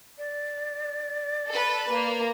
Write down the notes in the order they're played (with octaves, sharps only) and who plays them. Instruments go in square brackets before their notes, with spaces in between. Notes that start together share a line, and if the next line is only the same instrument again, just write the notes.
[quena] D5
[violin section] A4 B4
A#3